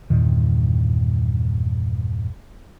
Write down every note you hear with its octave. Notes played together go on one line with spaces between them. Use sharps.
E2 G2 A#2 D#3